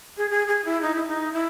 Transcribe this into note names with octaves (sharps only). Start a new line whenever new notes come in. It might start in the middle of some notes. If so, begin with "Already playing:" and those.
G#4
G#4
G#4
E4
D#4
E4
D#4
E4